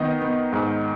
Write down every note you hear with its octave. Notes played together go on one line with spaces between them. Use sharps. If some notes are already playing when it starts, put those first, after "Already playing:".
Already playing: D#3 B3 D#4 D#5
B3
G#2